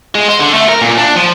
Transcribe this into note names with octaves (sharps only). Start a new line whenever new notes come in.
G#3
C5
D3
A3
A#4
A#2
D4
F3